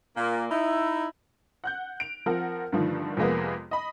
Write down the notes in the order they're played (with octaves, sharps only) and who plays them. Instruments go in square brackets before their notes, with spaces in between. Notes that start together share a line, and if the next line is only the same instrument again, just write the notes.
[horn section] A#2 A#3
D#4 E4
[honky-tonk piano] F#5 F#6 G6
D7 F7
F3 C4 A#4 F#5
G2 D3 D#3 F3 A3
F2 C3 G#3 A#3 B3
D#5 B5